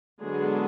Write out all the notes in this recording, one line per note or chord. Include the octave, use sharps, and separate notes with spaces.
D3 F#3 G#3 B3 D4 G#4